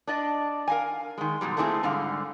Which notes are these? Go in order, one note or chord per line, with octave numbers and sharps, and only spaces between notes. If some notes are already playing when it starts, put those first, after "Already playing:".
D4 D5 D#5
A#4 F5 G#5
D#3 G#3
G#2 B2 F#3 G3
A3 A#3 C4 D4 E4 G#4
G#2 D3 G3 F5